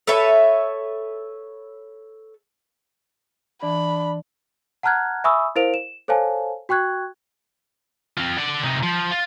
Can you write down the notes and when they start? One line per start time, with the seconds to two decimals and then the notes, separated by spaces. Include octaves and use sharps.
0.07 A4 B4 C#5 E5
3.63 E3 D4 B5
4.83 F#5 A5 A#5 F6 F#6 G#6
5.24 E5 G#5 B5 C#6 D#6 E6
5.56 E4 A#4 C5 F5 D7 F7
5.74 E7
6.08 A4 C5 C#5 F5 G#5 A5
6.69 F#4 G5 C#6 F#6 G#6
8.18 C4 F4
8.38 D5 F#5
8.64 C3 D#4
8.83 F3
9.11 F4